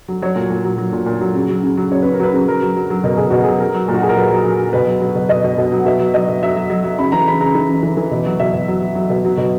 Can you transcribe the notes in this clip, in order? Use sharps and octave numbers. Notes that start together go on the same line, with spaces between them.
F#3
F#3 C#5
A#2
A#2
F#3
F#3
A#2
A#2
F#3
C#3
F#3
C#3
F#3
C#3 C#5
C#3 B4
A#4
F#3 B4
C#3
F#3 A#4
F#3
F#3
F#3
B2 A#4
B2 G#4
B2 F#4
F#3 G#4
F#3 A#4
F#3
A#2
F#4
A#2 G#4
A#4
F#3 B4
F#3
F#3
F#3
B2 B4
F#3
F#3
B2
B2 D#5
B2
B2
F#3
F#5
B2 E5
F#3
F#3 D#5
B2
F#3 E5
F#3
F#3
F#3
C#3 B5
E3 A#5
C#3 B5
C#3 A#5
E3
C#3
E3
E3
B2
F#3
B2 E5
B2
F#3
F#3
F#3
B2
F#3
B2